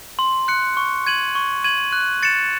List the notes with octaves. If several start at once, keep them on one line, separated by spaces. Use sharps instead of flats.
C6
F#6 C#7
C#6
G#6 D#7 F#7
C#6
G#6 D#7 F#7
F#6
A6 C#7 E7